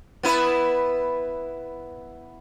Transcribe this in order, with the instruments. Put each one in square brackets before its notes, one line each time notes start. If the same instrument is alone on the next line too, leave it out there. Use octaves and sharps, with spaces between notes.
[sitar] B3 E4 B4